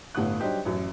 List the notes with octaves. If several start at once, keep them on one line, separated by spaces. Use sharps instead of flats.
G1 A2 F#5 D#6 F#6
F#3 G3 D4 D#4 G4 C5
A1 F#2